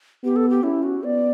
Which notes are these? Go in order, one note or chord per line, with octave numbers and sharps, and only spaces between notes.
B3 G4
A4
G4
C#4 E4
F#4
B3 D5